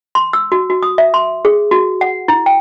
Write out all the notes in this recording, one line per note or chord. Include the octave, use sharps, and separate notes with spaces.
C6
E6
F#4
F#4
D#6
E5
C6
G#4
F#4
F#5
E4
G5